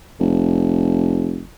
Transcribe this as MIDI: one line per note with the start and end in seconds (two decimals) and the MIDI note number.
0.20 1.44 29